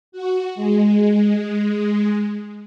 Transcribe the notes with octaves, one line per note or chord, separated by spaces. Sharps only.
F#4
G#3